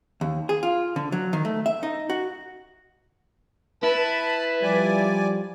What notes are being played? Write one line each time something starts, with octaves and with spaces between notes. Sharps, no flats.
D#2
G#4
F4
D3
F#3
D#3
A3
E5
D#4
F#4
E4 B4 A5
F3 G3 D5 G#5